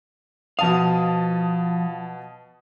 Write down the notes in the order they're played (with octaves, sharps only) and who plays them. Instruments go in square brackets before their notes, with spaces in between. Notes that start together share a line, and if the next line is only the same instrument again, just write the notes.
[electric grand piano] B2 A5 D#6 [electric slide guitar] F3 F5